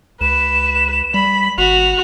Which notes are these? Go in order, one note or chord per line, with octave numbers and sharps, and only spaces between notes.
C#2 B4 E7
G3 B5
G#1 F#4 F7